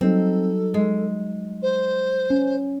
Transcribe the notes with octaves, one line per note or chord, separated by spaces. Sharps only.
F#3 G3 C4 D#4 A4
G#3
C5
C#4